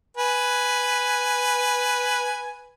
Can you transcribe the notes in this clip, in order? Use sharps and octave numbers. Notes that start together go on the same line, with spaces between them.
B4 G#5